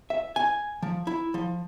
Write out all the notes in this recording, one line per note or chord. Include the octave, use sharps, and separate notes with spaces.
E5
G#5
F3
E4
F3